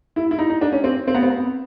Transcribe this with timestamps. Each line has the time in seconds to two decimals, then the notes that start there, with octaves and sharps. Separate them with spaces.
0.16 E4
0.31 E4
0.39 D#4
0.50 D#4
0.61 D4
0.72 C#4
0.84 C4
1.07 C4
1.14 B3
1.23 C4
1.30 B3